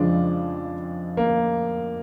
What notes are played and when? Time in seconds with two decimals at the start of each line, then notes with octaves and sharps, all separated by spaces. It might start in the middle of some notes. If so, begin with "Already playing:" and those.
Already playing: F2 C#3 F3 G#3 D4
1.17 A#3